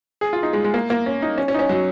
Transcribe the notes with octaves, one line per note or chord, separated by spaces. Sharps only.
G#4
F4
D#4
G#3
G#3
A#3
A#3
C#4
D#4
C#4
C#4
D#4
C#4
F#3